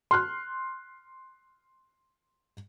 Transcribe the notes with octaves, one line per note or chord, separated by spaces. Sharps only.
C6 F6 F#6